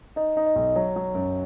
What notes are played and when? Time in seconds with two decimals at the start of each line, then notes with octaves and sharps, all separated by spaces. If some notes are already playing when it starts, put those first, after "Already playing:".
0.16 D#4 D#5
0.37 D#4
0.47 D#5
0.56 B1
0.76 F#3 C#5
0.96 F#3
1.15 F#2